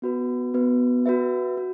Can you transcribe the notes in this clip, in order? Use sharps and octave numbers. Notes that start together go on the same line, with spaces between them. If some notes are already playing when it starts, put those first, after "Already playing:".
B3 F#4 B4
B3 F#4 B4
F#4 B4 E5
F#4